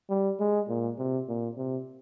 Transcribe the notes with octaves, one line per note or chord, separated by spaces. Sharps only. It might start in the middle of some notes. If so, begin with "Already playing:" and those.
G3
G#3
A#2
C3
A#2
C3